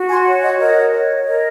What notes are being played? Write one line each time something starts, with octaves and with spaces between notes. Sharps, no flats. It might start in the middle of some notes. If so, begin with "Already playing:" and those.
Already playing: F#4
G#5 C6
C#5
D#5 F#5
A#4 D#5 F#5
C#5
A#4 D#5